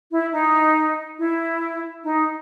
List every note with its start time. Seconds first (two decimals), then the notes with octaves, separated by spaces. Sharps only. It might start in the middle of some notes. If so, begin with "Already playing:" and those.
0.11 E4
0.33 D#4
1.18 E4
2.04 D#4